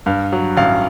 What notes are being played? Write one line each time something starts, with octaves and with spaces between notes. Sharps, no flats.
G2 F5
F#3
A1 F5